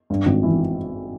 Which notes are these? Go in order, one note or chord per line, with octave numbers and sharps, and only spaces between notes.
G2
G#1
E3